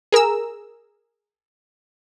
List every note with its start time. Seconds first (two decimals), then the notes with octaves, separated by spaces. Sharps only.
0.12 G#4 A#4 A#5 E6